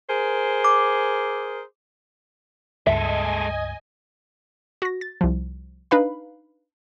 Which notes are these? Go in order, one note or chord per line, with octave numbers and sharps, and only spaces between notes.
G#4 A#4 C5
D6
C#2 G2 G#3 A4 D#5 E5 G#5
F#4 A#6
A6
C2 F3
D4 D#4 B4 F5 B5